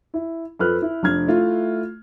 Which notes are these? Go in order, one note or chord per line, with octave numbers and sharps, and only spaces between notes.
E4
F2 A4 B4 F6 F#6
E4
F1 D4 F6 G#6
A3 E4 F4